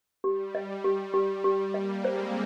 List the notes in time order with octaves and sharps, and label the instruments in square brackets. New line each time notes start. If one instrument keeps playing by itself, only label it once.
[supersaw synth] G3 [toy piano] G4
[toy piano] D#5
G4
G4
[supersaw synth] G3 [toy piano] G4
[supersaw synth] G3 A#3 [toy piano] D#5
[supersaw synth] G#3 C4 [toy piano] C5